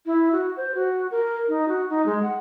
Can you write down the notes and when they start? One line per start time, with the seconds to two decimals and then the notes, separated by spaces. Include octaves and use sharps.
0.06 E4
0.32 F#4
0.57 C5
0.75 F#4
1.11 A#4
1.48 D#4
1.68 F#4
1.90 D#4
2.06 G#3
2.23 F#5